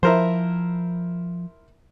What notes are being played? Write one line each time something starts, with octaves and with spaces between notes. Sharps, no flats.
F3 E4 A#4 C5